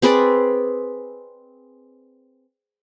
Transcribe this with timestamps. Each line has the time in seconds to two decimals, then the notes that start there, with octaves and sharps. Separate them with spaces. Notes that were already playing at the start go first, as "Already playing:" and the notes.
0.02 C4 G#4 B4 D5